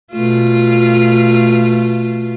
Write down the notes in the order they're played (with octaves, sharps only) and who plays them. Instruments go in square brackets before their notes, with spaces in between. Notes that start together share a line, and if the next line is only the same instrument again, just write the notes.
[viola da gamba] B2 A3 F4